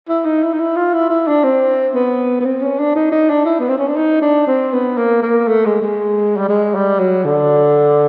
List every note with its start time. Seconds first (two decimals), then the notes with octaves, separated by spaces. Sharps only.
0.08 E4
0.25 D#4
0.43 E4
0.53 D#4
0.59 E4
0.76 F4
0.94 E4
1.10 E4
1.27 D4
1.44 C4
1.94 B3
2.40 B3
2.45 C4
2.62 C#4
2.79 D4
2.95 D#4
3.11 D#4
3.30 D4
3.45 E4
3.59 B3
3.69 C4
3.78 C#4
3.88 D4
3.96 D#4
4.22 D4
4.47 C4
4.73 B3
4.97 A#3
5.22 A#3
5.47 A3
5.65 G#3
5.82 G#3
6.37 G3
6.49 G#3
6.74 G3
6.99 F#3
7.24 D3